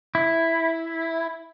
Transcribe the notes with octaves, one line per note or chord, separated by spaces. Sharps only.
E4